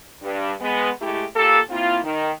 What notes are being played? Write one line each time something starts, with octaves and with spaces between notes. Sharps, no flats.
G2
G#3 B3
G#3 A3 E4 G4
A#2 A#3 G4 A4
A#3 C4 E4 F4
D#3